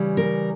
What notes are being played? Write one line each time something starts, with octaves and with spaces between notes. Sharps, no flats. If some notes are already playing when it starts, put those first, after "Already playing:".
Already playing: C#3 E3 G3
A#4